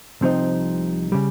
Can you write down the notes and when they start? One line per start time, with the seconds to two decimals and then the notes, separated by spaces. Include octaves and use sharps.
0.21 C2 C3 F3 C4 D#4
1.12 C#3 G3